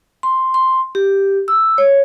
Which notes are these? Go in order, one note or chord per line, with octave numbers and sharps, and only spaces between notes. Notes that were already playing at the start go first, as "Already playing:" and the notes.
C6
C6
G4
E6
C#5